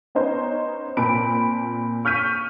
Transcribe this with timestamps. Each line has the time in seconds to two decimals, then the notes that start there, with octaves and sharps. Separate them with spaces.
0.15 B3 C#4 D#4 C5
0.97 A#2 C4 A5 B5 D7
2.05 C#6 F6 G6 B6 D#7